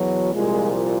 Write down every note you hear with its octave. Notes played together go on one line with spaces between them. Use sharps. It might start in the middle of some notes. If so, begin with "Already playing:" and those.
Already playing: E2 B2 F#3
C2 A#2 F3 G#3